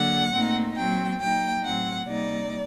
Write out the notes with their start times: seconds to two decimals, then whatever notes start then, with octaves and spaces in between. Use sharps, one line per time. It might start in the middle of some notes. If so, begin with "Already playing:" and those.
Already playing: D3 F#3 A#3 F#5
0.32 A#2 A3 C4 D#4
0.76 A#2 F#3 C4 G5
1.20 F#3 A#3 D#4 G5
1.64 A2 F#3 C4 F#5
2.07 C3 G3 A#3 D#4 D5